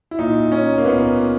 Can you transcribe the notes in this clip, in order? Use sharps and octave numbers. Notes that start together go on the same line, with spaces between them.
E4
A#2 D#4
C#4
A#3
A#2 B3